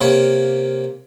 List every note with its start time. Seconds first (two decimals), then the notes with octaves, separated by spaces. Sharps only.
0.01 C3 A#3 C#5